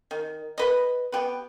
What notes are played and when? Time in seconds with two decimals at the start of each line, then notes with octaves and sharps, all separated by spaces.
0.11 D#3
0.58 B4 D#5
1.12 B3 G4 B4